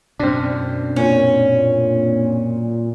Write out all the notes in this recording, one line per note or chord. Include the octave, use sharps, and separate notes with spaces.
F#2 B2 C4 D4
A#2 C#4